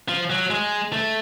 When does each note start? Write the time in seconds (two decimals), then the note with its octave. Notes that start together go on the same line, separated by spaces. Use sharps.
0.09 F3
0.30 F#3
0.50 G#3
0.93 A3